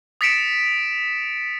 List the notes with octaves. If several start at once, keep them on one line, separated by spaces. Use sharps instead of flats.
D#6 A6 B6 C#7 D7 E7